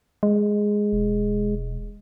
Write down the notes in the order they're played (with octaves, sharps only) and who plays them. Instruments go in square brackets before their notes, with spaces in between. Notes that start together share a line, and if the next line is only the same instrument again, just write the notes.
[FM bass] G#3
[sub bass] E1